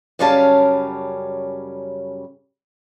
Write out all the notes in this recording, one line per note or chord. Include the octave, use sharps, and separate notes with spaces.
F#2 C#3 G3 C#4 F5 A5